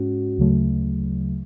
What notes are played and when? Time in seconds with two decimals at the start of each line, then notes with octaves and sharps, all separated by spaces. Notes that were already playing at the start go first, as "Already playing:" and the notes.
Already playing: G#2 G#3 C#4 F#4
0.38 D2 C#3 F#3 A3